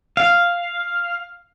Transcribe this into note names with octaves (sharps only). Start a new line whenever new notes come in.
F5